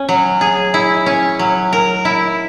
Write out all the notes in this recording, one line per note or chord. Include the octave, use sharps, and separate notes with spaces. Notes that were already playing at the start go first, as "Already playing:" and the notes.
Already playing: C#4
F#3
G#4
E4
C#4
F#3
A#4
E4